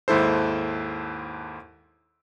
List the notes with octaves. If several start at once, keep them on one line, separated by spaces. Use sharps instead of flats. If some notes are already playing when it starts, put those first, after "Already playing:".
D#2 G#2 E4 A4 C5